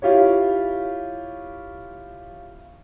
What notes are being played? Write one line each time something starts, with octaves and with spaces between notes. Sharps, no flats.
E4 F4 G4 C#5